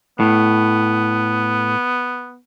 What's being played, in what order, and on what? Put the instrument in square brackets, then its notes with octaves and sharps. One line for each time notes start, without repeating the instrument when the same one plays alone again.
[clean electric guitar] A2 [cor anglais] B3